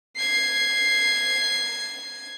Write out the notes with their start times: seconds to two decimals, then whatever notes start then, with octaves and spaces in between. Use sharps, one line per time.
0.17 G#6 C7